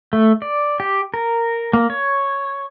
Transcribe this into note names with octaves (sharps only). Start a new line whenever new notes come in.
A3
D5
G4
A#4
A#3
C#5